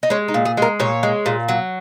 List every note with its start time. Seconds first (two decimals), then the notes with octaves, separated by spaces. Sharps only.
0.03 D#4
0.10 G#3 C#4
0.28 D#4
0.34 A#2
0.45 G#4
0.57 G#3 A#4
0.80 A#2 C#5
1.03 G#3
1.26 A#2
1.49 F#3